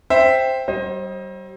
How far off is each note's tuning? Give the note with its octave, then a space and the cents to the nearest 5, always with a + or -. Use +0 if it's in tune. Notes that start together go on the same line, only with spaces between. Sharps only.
C5 +0 E5 +0 G5 +0
G3 -40 C5 +30 D#5 +10